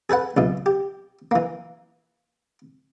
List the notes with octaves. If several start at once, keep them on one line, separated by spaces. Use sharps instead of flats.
G#4 A4 B4 F#5
C#2 F#2 B2
G4
E3 A#3